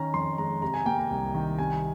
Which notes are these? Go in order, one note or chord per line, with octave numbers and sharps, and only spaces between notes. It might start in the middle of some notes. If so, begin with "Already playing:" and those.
Already playing: D#3 C#4 A#5
F2 C6
G#3 A#5
C3 A#5
G#5
A#3 G5
A#5
C2
D#3
C3 G#5